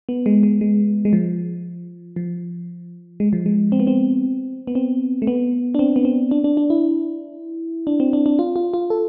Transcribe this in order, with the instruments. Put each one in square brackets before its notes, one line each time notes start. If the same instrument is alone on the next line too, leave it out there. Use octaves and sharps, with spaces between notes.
[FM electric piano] B3
G#3
G#3
G#3
G#3
F3
F3
G#3
F3
G#3
C4
B3
C4
B3
C4
A3
B3
D4
C4
B3
C4
D4
D4
D4
E4
D4
C4
D4
D4
F4
F4
F4
A4